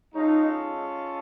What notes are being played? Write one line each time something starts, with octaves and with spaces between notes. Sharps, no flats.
G#3 C#4 D#4 F4 A4